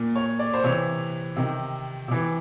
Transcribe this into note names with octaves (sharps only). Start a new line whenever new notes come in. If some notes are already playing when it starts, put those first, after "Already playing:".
Already playing: A#2
C#5
D5
C5
C3 E3 C#5
C3 D#3
C3 E3